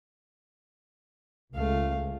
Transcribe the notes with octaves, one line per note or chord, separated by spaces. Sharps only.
C#2 A3 F5